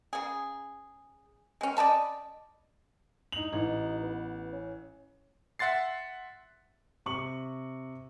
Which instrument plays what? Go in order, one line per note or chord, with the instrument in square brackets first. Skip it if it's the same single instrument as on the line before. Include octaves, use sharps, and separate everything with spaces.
[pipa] C#3 G#4
G#3 C#4
D5 D#5 A5 B5
[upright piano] D#4 F#7
[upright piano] A1 [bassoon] D#4
[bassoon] B3
C#4
[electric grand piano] E5 F#5 C6 A6 C7
[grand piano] C3 C#6 F#7